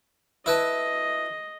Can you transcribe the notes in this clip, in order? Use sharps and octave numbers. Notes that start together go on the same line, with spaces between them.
E4 B4 D#5 A5